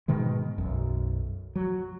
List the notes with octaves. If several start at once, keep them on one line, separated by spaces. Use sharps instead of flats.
G#2 B2 D#3 G#3
B1 F#2
F#3